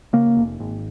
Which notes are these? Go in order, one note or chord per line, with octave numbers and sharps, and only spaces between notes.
C#3 A#3
F1
G#1